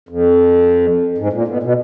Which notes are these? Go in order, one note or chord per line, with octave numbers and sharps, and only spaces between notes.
F2
G#2
A#2
B2
B2